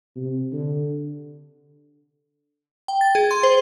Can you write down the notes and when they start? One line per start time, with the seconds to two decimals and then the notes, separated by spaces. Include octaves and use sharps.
0.16 C3
0.53 D3
2.88 G5
3.01 A6
3.15 G#4
3.31 C6
3.43 C5